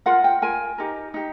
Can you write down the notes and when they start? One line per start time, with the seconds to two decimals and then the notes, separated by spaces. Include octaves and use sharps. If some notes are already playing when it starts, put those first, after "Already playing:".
0.06 F4 A#4 F#5
0.24 G5
0.42 F4 A#4 G#5
0.78 D#4 G4 A#4
1.14 D#4 G4